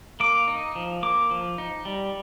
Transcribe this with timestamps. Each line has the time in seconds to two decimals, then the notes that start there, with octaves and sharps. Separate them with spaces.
0.20 A#3 D6
0.48 D#4
0.75 F3
1.03 A#3 D6
1.31 F3
1.58 D#4
1.85 G3